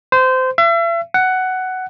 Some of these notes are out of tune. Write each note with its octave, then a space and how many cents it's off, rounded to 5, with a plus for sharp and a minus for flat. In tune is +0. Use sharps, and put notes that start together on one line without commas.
C5 -20
E5 +40
F#5 +10